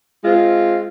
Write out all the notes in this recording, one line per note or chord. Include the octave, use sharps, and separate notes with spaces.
G#3 C4 F4